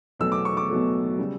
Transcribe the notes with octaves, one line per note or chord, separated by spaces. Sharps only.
E2 B2 F#3 A3 E6
D6
C#6
D6
E2 B2 F#3 A3
C#3 G3